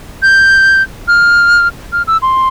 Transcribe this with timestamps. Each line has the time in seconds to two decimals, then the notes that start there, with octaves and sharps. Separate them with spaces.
0.22 G6
1.08 F6
1.92 F6
2.07 E6
2.22 C6